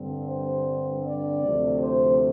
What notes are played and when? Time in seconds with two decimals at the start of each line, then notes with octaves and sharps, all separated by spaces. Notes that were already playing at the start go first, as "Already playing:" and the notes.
Already playing: G2 D3 G3 C4
0.28 C5
1.04 D5
1.42 D2 C3 F3 A3
1.80 C5